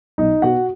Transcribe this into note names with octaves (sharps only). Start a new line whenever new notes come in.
B1 D#4 D#5
B2 F#4 F#5